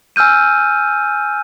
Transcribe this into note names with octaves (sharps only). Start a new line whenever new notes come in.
G#5 E6 F6 G6 D#7